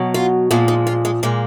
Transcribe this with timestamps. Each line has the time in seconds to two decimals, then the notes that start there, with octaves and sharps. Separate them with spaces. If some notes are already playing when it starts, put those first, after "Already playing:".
Already playing: B2 F#3
0.14 F4
0.51 A#2 F3 G#3 F4
0.68 D#4
0.87 F4
1.05 G#3
1.23 A#2 G#3 A#3